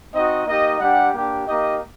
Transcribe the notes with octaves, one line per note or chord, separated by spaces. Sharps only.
C4 D#4 F#4 D#5
A#3 D#4 G4 D#5
G3 D4 G4 F#5
A#3 D4 G4
A#3 D#4 G4 D#5